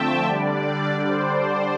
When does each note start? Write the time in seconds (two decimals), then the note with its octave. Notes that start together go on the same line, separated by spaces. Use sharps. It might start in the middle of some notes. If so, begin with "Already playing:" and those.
Already playing: D3 F3 A3 C4 E5 G5 A5
0.25 D3 G3 D4 D5
1.08 C5